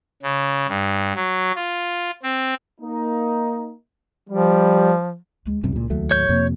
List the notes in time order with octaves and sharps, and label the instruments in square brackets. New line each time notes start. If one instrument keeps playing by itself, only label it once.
[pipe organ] C#3
G2
F#3
F4
C4
[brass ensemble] A#3 D#4
[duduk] F3 [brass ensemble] G3
[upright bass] D2 G#3
[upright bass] C#2 E4 [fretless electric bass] F#2 C3 G3
[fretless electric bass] A#2
D#2 F#3 A3
[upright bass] A1 [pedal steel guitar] C#5 G6
[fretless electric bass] F2 C3 [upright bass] A#3